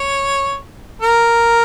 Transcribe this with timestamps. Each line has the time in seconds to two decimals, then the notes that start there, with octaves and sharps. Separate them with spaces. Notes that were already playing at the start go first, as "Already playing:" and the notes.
Already playing: C#5
1.02 A#4